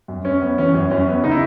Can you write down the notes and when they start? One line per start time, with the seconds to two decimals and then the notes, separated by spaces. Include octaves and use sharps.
0.08 F#2
0.24 F#2 C#4
0.41 B3
0.58 E3 C#4
0.74 F#2
0.91 F#2 C#4
1.08 B3
1.23 C#3 D#4
1.31 E4